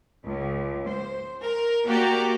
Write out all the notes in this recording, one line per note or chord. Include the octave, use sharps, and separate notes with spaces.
C#2
C5
A#4
A#3 F#4 G4 D5 A#5